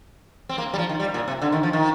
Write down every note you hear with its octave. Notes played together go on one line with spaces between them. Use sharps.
C4
A#3
G3
F3
D#3
G3
A#2
C3
D3
D#3
F3
D#3